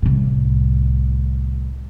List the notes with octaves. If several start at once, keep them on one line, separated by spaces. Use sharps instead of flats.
C2 A2